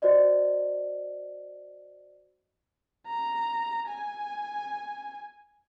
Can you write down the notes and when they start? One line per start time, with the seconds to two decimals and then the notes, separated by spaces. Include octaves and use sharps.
0.02 F#4 C5 D5 D#5
3.07 A#5
3.89 G#5